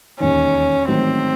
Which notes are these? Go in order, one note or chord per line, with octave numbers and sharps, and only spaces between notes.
E1 D#2 D#3 C#4
A1 G#2 D#3 F#3 C4